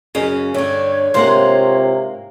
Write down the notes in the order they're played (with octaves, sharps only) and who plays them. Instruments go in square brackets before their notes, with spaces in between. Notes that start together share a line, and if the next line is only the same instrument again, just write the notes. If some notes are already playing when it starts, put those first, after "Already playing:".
[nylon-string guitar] F#2 C#4 D#5 [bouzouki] C#3
[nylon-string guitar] G2 D3 [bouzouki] A3 [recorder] C#5
[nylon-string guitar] G#2 A#3 F#5 [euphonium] C3 [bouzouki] F4 C5